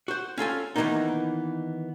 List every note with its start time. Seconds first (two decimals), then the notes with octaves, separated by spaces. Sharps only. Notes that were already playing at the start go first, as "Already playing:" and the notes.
0.08 F#4 C5
0.38 C#4 F4 A4 G#5
0.76 D#3 E3 G#3 A#3 B3 D#4